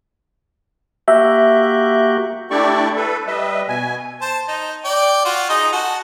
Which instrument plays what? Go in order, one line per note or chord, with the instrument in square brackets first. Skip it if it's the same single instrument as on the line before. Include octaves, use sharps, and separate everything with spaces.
[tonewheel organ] A#3 F#4 G4 [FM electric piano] E5
[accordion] A3 D4 E4 G4 D5 C#6
A4 B4
G3 B4 D#5 E5
B2 G#5
[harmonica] C5 A5
D#4
D5 G5
F4 F#4
D#4 G#4 D#5
F#4 A4